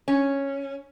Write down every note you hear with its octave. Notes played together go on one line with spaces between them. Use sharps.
C#4